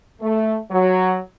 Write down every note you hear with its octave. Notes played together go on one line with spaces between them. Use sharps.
A3
F#3